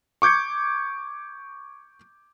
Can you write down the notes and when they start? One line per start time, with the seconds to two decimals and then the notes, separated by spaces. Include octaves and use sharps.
0.22 C#6 D6 G6 G#6 C#7